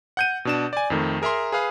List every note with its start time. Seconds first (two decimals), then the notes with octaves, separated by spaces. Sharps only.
0.17 F#5 G6 D#7
0.45 B2 D4 E7
0.73 D5 G#5
0.90 F2 D#3 A3
1.22 G#4 A#4 E5 A#5 C6
1.52 G#4 B4 F5